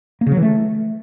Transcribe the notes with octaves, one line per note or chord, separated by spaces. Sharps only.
A#3
C#3
F#3
E3
A3